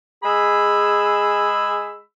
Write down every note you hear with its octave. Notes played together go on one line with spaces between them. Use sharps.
G#3 G#4 B5 E6